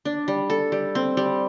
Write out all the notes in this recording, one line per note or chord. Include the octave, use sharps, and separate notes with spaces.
D4
G3
A4
G3
C4
G3